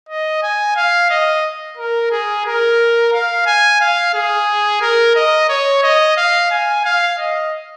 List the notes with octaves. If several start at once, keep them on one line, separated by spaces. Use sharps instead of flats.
D#5
G#5
F5
D#5
A#4
G#4
A#4
F5
G#5
F5
G#4
A#4
D#5
C#5
D#5
F5
G#5
F5
D#5